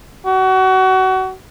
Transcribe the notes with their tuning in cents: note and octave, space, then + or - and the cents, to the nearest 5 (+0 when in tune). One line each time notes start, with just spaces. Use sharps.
F#4 +30